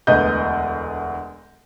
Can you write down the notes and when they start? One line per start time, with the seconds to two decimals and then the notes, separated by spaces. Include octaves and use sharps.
0.07 E1 D2 B4 D#5 G6